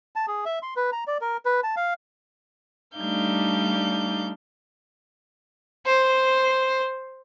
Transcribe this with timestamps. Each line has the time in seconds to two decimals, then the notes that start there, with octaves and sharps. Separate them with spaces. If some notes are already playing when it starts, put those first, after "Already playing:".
0.16 A5
0.27 G#4
0.45 E5
0.62 C6
0.76 B4
0.92 A#5
1.07 D5
1.21 A#4
1.45 B4
1.63 A5
1.77 F5
2.97 G3 A3 D4 D#4 F5 G6
5.86 C5